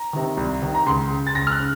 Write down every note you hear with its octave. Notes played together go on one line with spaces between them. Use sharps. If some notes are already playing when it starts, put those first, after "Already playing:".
Already playing: A#5
C3 D#3
C2
C3 D#3
A#5
C#2 C6
C#3
A6
C#2 A#6
F6
F#6
C#3